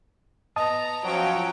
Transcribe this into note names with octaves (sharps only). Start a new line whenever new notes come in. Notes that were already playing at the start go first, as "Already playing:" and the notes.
B3 D#5 A5 A#5 D#6
F3 F#3 C#4 G5